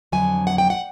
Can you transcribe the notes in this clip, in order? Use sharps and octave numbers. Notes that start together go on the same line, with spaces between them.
F2 D3 F#3 G#5
F#5
G5
F#5